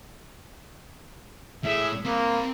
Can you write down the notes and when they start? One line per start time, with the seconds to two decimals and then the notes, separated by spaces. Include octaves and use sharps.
1.64 A2 G#4 E5
2.05 A#3 C4 B5